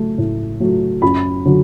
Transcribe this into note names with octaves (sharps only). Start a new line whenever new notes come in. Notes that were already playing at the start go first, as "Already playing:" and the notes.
Already playing: F#3 A3
A2
F#3 A3
F#2 B5
D3 F#3